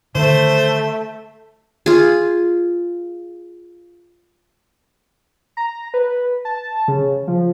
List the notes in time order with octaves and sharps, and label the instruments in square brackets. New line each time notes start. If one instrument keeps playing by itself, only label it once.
[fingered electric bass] D3 D#3 [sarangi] A3 [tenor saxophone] C5
[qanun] F4 G#4
[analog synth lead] A#5
B4
A5
C#3
F3